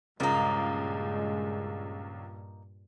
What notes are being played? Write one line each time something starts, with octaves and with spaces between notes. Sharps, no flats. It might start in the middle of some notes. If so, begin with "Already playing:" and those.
C#2 G2 A#2 G#3 A#3 D#4